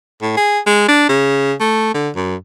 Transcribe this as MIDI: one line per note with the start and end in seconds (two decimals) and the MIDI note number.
0.22 0.37 45
0.37 0.59 68
0.66 0.87 56
0.88 1.07 62
1.09 1.53 49
1.60 1.94 57
1.94 2.09 50
2.15 2.35 42